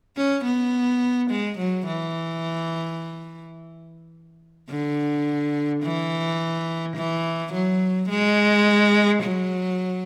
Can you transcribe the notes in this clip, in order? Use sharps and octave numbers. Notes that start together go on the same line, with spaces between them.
C#4
B3
G#3
F#3
E3
D3
E3
E3
F#3
G#3
F#3